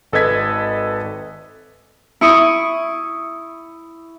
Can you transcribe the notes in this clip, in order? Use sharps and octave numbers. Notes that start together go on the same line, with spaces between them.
G#1 A4 B4 D#5 G#6 B6
E4 C#6 D#6